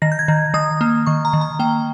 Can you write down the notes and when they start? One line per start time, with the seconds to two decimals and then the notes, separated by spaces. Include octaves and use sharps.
0.02 D#3 A#6
0.12 G6
0.19 G#6
0.28 D#3
0.54 D#3 D#6
0.81 A#3
1.06 D#3 C#6
1.25 A#5
1.33 D#3
1.41 A#5
1.59 A#3 G5